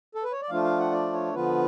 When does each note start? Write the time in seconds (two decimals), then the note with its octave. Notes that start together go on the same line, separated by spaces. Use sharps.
0.15 A4
0.24 B4
0.32 C#5
0.42 D5
0.49 F3 A3 D4 F4 F5
0.64 F5
0.79 F#5
0.92 D5
1.13 C#5
1.33 D3 F3 B3 F4 B4